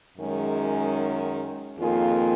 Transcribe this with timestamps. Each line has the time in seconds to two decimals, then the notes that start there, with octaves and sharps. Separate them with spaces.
0.18 F#2 D#3 G#3 C#4
1.79 F2 D#3 A#3 F4 G#4